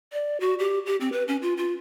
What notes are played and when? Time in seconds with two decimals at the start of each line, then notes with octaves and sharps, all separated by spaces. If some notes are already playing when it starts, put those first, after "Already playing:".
0.13 D5
0.40 F#4
0.59 G4
0.86 G4
1.01 C4
1.13 B4
1.28 C#4
1.42 F4
1.58 F4